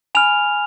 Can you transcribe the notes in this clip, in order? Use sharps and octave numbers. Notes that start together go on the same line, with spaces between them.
G#5 B5 F6 F7